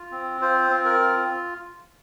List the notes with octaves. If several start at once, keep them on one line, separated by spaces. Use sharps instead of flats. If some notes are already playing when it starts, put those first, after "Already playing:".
Already playing: F4
C4
F4 C5
C4
A#4
F4